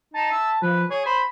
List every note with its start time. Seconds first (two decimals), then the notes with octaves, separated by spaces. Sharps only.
0.14 D#4 A5
0.31 E5
0.62 F3 B4
0.90 G#4 C#5
1.06 C5 B5